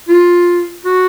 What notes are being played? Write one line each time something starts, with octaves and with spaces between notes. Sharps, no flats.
F4
F#4